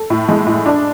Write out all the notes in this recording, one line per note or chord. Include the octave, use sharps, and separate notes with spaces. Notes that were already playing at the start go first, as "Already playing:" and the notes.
Already playing: A4
A2
G#3
A2
D4